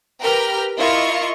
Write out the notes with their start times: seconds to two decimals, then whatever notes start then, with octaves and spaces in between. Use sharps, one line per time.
0.22 G4 A#4 B4 G5 A#5 F6
0.78 E4 F4 A#4 D#5 F5 C#6